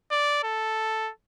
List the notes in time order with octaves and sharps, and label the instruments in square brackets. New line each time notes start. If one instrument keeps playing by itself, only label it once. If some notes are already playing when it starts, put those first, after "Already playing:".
[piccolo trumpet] D5
A4